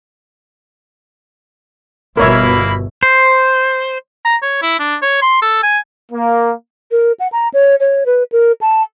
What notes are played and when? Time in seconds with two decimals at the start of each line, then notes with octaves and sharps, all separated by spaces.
2.17 G1 B2 A#3 E4 A#4 C#5 E5 B5
3.03 C5
4.25 A#5
4.42 C#5
4.62 E4
4.79 D4
5.02 C#5
5.22 C6
5.42 A4
5.63 G#5
6.12 A#3
6.91 A#4
7.20 F#5
7.32 A#5
7.54 C#5
7.80 C#5
8.06 B4
8.32 A#4
8.61 A5